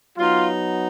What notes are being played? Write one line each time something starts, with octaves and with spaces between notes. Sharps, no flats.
F#3 B3 D#4 F4